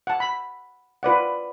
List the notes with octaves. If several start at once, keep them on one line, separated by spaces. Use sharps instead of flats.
F#5 A5
B5
F4 B4 D5 F#5